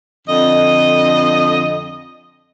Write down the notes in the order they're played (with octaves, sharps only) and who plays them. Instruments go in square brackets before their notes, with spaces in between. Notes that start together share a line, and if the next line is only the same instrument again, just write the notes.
[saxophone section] F2 D3 D#5